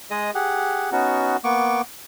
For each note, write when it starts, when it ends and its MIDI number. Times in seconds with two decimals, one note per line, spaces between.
0.11 0.31 56
0.11 0.31 68
0.11 0.31 75
0.11 0.31 87
0.35 0.90 67
0.35 0.90 68
0.35 0.90 78
0.92 1.37 59
0.92 1.37 61
0.92 1.37 63
0.92 1.37 66
1.44 1.81 58
1.44 1.81 59
1.44 1.81 85
1.44 1.81 86